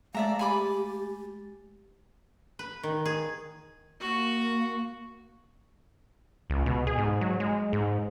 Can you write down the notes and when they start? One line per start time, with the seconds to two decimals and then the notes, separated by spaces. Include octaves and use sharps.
0.15 G#3 A3 D5 E5 F5 A#5 A6
0.39 G4 G#5 B5 D6
2.59 B4
2.83 D#3
3.05 G#4
4.00 A#3 F#4 C#6
6.50 C#2
6.66 B2
6.87 G#4
6.98 G#2
7.21 F#3
7.40 G#3
7.73 G#2